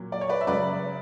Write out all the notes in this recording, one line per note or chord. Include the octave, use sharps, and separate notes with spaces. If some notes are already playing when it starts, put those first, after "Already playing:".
Already playing: A#2 F#3
D5
C#5
B4 D5
E5
C#3 F#3 B4 D5